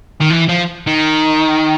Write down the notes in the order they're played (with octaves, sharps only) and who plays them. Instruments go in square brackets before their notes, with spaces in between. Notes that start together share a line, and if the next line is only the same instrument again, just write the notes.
[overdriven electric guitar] D#3
E3
F3
D#3